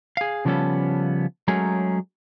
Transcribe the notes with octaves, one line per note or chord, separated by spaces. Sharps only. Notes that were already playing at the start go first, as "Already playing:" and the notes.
G#4 F5
C#3 F3 G3 B3 C#4 A4
F#3 G#3 A3 C#4 G#4 A#4